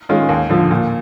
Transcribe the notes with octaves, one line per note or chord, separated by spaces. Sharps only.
D#3 G#3 C#4 F4
D#2
D3 F3
A#2